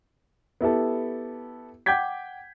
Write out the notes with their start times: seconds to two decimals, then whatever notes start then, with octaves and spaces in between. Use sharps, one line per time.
0.61 B3 E4 G4 A4
1.86 F#5 G5 D6 G6 G#6 B6